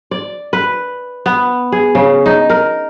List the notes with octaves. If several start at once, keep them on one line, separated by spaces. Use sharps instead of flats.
D5
B4
B3
G#4
C#3
D#4
A#4